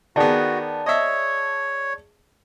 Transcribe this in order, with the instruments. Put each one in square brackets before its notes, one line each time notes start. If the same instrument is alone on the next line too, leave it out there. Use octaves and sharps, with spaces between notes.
[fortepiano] D#3 B3 [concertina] F#4 [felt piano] G#4 D5 A5
[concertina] C#5 [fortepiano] D#5 E5